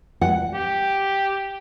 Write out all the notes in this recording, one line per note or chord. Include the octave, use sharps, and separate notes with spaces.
F#5
G4